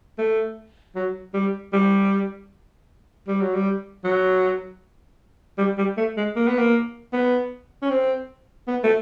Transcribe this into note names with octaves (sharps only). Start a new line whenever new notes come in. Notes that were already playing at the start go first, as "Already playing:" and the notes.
A3
F#3
G3
G3
G3
F#3
G3
F#3
G3
G3
A3
G#3
A#3
B3
A#3
B3
C#4
C4
B3
A3